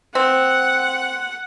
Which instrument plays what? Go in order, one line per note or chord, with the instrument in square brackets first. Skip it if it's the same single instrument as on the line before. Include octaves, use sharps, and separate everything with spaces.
[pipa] C4 [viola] F#5